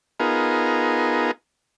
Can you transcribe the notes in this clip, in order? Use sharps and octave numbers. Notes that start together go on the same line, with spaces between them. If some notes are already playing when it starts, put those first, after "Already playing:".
B3 D#4 F4 G#4 A#4